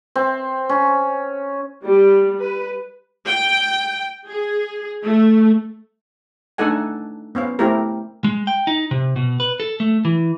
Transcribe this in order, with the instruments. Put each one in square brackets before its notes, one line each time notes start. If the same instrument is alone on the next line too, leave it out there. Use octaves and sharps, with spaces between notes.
[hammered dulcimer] C4
C#4
[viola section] G3
B4
G5
G#4
A3
[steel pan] A3 D4 D#4 A4 F#5 G#5
B3 C#4 C5 F5
A3 C4 E4 G4 A#4
[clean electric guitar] G#3
G5
D#4
C3
B2
B4
A4
A3
E3